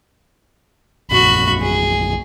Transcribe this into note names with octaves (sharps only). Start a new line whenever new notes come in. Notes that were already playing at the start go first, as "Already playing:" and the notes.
A#1 F#2 A#2 F#4 B5
G#4